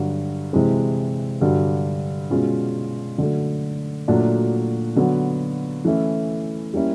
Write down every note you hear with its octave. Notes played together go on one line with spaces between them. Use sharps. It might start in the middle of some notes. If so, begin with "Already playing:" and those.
Already playing: G2 D3 F#3
C3 E3 G#3 C4
G2 D3 F#3
B2 G#3 C#4 F4
D3 F#3 A3
A#2 F#3 A3 D4 F#4
D3 F#3 B3
E3 A3 C#4 E4
G3 A#3 C#4 E4